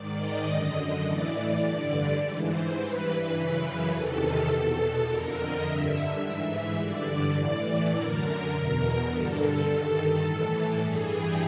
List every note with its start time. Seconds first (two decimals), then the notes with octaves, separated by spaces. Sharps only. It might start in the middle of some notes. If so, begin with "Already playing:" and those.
Already playing: G#2 D#3 D5
0.16 D#5
0.45 F#2 D3 D#5
1.03 A2 E3 D5
1.60 G2 D3
2.17 G#2 E3
2.46 C5
2.75 G2 E3 B4
3.33 F#2 C#3 E3
3.90 E2 C3 D#3 A4
4.47 E2 B2 A4
5.04 F2 D3 A#4
5.34 D#5
5.62 G2 E5
5.67 D3
6.20 G#2 E3
6.77 G2 D3 D5
7.34 A2 E3
7.92 F#2 D3 A#4
8.50 E2 B2
9.07 G2 D3 A4
9.37 A4
9.66 G2 D#3
10.23 A2 E3
10.80 G2 E3 G#4
11.09 G4